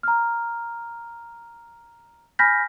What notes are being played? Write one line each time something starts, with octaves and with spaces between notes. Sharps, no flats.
A#5 F6
G#5 B5 F6 G6 A#6 B6